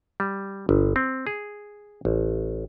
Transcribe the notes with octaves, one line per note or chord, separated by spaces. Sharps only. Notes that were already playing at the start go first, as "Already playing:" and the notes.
G3
G1
C4
G#4
A1